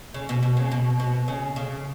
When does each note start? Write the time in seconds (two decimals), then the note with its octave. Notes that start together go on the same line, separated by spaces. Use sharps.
0.14 C#3
0.29 B2
0.43 B2
0.57 C#3
0.72 B2
1.00 B2
1.28 C#3
1.56 C#3